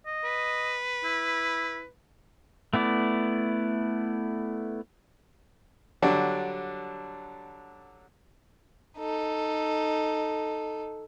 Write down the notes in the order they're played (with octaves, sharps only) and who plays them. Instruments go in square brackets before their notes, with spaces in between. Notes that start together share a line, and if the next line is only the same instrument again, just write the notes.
[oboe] D#5
[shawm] B4
[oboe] E4
[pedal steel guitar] A3 B3 E4 D5
[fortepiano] D3 F#3 G3 D4
[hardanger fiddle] D#4 A4